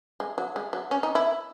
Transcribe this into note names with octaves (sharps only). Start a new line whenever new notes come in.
G#3
F#3
G#3
F#3
C#4
D#4
E4